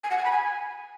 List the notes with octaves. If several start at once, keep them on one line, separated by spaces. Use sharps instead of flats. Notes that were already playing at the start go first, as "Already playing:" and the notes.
G#5
F#5
G#5
B5
G#5